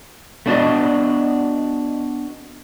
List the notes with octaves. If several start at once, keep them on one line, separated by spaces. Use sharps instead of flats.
A3 B3 D4 F#4 D5 D#5